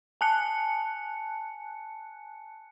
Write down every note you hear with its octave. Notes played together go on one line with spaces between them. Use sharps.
G#5 A5 F#6 C#7